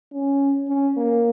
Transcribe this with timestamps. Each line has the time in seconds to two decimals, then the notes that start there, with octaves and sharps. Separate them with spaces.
0.13 C#4
0.69 C#4
0.97 A#3